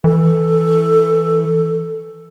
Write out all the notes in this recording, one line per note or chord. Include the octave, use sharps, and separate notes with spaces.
E3 A4